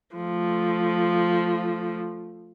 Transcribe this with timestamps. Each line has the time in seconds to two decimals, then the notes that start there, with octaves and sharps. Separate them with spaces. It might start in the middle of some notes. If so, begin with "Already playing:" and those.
0.16 F3 A3